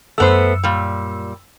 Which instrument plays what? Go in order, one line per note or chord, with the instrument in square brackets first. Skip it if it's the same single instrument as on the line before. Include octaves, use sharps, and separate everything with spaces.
[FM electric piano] F#2 E6 [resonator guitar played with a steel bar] A3 B3 C5
[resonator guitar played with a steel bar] A#2 G3